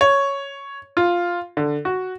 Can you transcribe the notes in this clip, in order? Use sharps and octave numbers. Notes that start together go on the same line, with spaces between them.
C#5
F4
D3
F#4